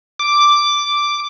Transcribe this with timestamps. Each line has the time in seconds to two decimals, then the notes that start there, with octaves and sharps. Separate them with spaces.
0.20 D6